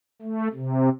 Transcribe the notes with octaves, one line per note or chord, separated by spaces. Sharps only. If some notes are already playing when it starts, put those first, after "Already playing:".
A3
C3